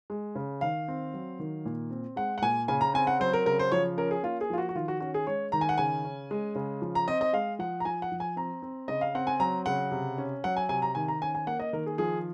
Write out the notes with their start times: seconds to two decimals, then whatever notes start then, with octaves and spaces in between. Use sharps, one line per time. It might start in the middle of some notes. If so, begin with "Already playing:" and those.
0.10 G#3
0.35 C#3
0.61 D#3 F5
0.88 C4
1.14 F#3
1.39 D#3
1.65 A#2
1.91 C4
2.16 G#3 F#5
2.38 F#5
2.42 A#2 G#5
2.68 C#3 G#5
2.81 A#5
2.94 C4 G#5
3.07 F#5
3.20 F#3 C5
3.33 A#4
3.46 C#3 A#4
3.59 C5
3.72 F3 C#5
3.98 C#4 A#4
4.11 G#4
4.23 A#3 F4
4.41 G#4
4.50 F3 F4
4.58 F#4
4.69 F#4
4.75 D#3 F4
4.88 F#4
5.00 C#4 F#4
5.14 G#4
5.27 G#3 C#5
5.52 D#3 A#5
5.61 G#5
5.69 F#5
5.78 C#3 G#5
6.05 C#4
6.31 G#3
6.55 C#3
6.82 F3
6.95 A#5
7.08 C4 D#5
7.21 D#5
7.33 G#3 F5
7.59 F3 F#5
7.80 A#5
7.85 F3 G#5
8.02 F#5
8.12 F3
8.20 G#5
8.36 C4 A#5
8.62 C4
8.88 C#3 D#5
9.01 F5
9.15 C4 F#5
9.27 G#5
9.40 F#3 A#5
9.66 C#3 F#5
9.91 C3
10.18 C#4
10.44 F#3 F#5
10.56 G#5
10.69 C3 G#5
10.82 A#5
10.95 D#3 G#5
11.08 A#5
11.21 C#4 G#5
11.35 G#5
11.47 A#3 F#5
11.60 D#5
11.73 D#3 A#4
11.86 G#4
11.98 F3 G#4